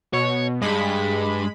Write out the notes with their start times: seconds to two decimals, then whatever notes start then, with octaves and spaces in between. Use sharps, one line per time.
0.13 B2 C#5
0.62 G2 G#3 B5